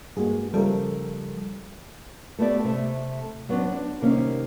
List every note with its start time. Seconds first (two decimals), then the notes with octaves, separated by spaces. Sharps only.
0.17 G2 G#3 A#3 F#4 G#4
0.54 C#3 F3 G3 A3 A4 A#4
2.39 A3 B3 G4 D5
2.64 C3 A3
3.49 F#3 B3 C4 D4
3.72 D4
4.02 C3 D#3 G3 A#3 C#4